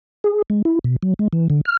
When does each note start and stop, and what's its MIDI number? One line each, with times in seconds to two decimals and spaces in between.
0.24 0.42 68
0.50 0.62 56
0.65 0.79 64
0.84 0.96 47
1.03 1.14 54
1.19 1.28 56
1.33 1.48 52
1.50 1.61 50
1.65 1.77 89